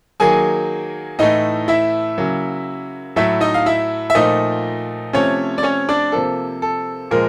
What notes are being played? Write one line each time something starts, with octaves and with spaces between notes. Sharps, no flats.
D#3 F#3 A#3 G#4 G#5
A2 E3 A3 D#4 D#5
E4 E5
C#3 F#3 A#3
A2 F#3 A3 E4 E5
D#4 D#5
F5
E4 E5
E5
A#2 F3 A3 D#4 D#5
C3 F3 A3 C#4 C#5
D5
C#4 C#5
D4 D5
C3 F3 A#3 A4
A4
A#2 F3 G#3 A#4